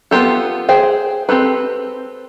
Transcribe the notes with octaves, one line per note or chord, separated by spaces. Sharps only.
B3 F4 G4 A4
G#4 C5 G5
C4 G4 A4 B4